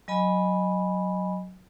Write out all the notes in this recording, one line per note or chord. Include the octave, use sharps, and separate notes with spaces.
F#3 D#5 G#5 B5